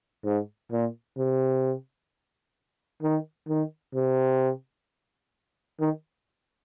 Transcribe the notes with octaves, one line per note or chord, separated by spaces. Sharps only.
G#2
A#2
C3
D#3
D#3
C3
D#3